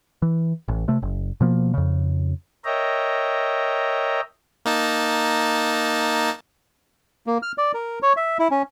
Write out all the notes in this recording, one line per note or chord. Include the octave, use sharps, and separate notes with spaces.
E3
A1
C3 A3
F#1
B2 F3 A#3
F2 C#3
A#4 C#5 D#5 E5 G5 A#5
A#3 D#4 A5
A#3
F6
D5
A#4
C#5
E5
E4
C#4